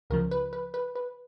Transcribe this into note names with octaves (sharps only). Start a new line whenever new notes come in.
C#2 C#3 F3 A#4
B4
B4
B4
B4